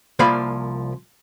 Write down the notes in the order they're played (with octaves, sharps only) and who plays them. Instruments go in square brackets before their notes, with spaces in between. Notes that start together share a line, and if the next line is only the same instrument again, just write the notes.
[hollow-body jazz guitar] C2 F3 A#3 D5 F5 B5